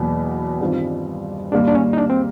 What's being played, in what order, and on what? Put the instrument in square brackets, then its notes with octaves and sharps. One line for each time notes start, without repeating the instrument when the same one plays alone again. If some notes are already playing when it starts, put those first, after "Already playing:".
Already playing: [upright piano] E2 B2 F#3 A#3
G2 D#3 G3 C4 F4
[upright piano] G#2 D#3 G3 A#3 [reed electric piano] D4
[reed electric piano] D4
C#4
D#4
D4
C4